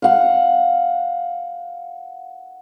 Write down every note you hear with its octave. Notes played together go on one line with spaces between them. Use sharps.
F5 F#5